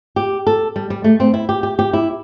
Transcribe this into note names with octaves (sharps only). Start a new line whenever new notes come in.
G4
A4
G3
G3
A3
C4
E4
G4
G4
G4
E4